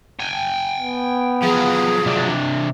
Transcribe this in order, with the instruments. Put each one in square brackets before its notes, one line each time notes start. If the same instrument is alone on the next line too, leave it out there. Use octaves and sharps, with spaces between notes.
[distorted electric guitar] G5 G#5
[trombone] B3
[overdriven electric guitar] F3 F#3 [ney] G#4
[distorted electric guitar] C3 D4